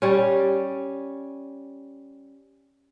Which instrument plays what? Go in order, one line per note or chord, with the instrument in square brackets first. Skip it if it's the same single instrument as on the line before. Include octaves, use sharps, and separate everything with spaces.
[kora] G3 C#4